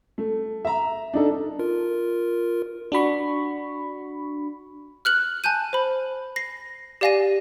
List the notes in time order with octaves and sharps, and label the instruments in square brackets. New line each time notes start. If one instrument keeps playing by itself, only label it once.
[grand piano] A3
E5 A#5
D4 D#4 A4
[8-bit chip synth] F4 A#4
[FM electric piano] D4 F#4 B5 C#6
[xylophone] F6 F#6 F#7
G#5 A5 F#6 G6 D#7
C5 B5
A#6 C7
G4 D5 F5 G#5 A#6 D#7